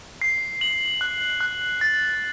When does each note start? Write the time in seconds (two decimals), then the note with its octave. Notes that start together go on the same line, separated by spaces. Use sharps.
0.22 C7
0.61 F#7
1.01 F#6
1.41 F#6
1.81 A6